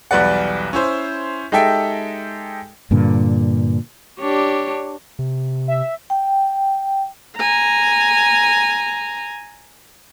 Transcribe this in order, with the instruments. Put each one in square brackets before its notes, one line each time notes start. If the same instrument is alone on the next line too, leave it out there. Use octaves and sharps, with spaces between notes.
[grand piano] B1 E2 G3 B4 D5 F#5
C#4 E4 C5
G#3 D#4 G4 A4 E5 G5
[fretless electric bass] G2 A#2 D3
[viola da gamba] D4 G4 C#5
[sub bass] C3
[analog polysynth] E5
[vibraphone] G5
[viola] G#5 A#5